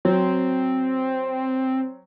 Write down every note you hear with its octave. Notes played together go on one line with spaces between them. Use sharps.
F#3 C4